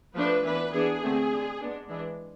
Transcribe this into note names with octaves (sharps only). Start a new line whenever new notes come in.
F3 A3 D4 B4
E3 B3 D4 B4
E3 B3 D4 G#4
D3 A3 C4
G#3 D4
G#3 B3 D4
E3 G#3 D4